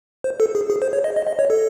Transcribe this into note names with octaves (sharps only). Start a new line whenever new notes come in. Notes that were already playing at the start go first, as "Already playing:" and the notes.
C5
A4
G#4
G#4
C5
C#5
D#5
D#5
D#5
C#5
A4